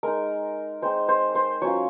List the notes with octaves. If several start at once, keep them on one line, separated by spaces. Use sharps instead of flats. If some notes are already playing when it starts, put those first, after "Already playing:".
G#3 D#4 A#4
G#3 C4 D#4 C5
C5
C5
F#3 C#4 F4 C#5